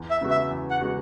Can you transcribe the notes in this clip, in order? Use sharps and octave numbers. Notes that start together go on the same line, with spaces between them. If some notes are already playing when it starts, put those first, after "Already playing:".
Already playing: E2
E5
C#3 G#3 B3 F#4
E5
E2
F#5
C#3 G#3 B3 F#4